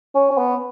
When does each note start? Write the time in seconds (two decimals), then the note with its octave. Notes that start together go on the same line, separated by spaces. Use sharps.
0.15 C#4
0.31 C#4
0.38 B3